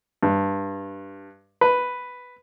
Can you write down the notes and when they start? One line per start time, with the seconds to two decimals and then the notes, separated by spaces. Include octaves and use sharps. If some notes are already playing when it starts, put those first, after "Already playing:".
0.23 G2
1.61 B4